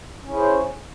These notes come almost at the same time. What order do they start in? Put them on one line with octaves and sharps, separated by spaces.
C#4 E4 G#4 C5 C#5